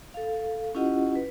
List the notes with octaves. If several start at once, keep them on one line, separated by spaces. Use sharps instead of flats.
A4 F5
C#4 E4 F4 G4 D#5 F#5
B4